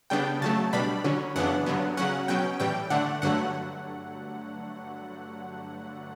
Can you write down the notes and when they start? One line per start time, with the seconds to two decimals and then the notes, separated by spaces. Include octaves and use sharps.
0.10 C#3 G3 B3 D4 G5
0.41 C#3 F#3 A3 A5
0.73 B2 G3 D4 B5
1.04 D3 F#3 C#4
1.36 F#2 C#3 E3 B3 D4 F#5
1.66 G2 D3 F#3 B3
1.97 C#3 F#3 C#4 F#5
2.28 B2 F#3 C#4 G5
2.60 A2 E3 G3 G5
2.90 D3 A3 D4 F#5
3.22 G2 D3 F#3 A3 F#5